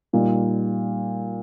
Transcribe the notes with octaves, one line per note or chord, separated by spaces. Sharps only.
A#2 G3 D#4